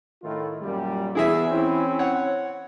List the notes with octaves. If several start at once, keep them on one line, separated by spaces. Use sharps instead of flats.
A2 D#3 F4
F#2 A#2 G3
E2 E4 G#4 E5
E3 C4 C#4 E4
C#5 F#5